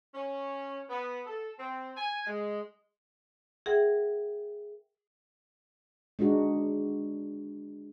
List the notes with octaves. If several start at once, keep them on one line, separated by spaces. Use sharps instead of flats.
C#4
B3
A4
C4
G#5
G#3
G#4 A#4 E5 F#5 G5
G#3 D4 D#4 F#4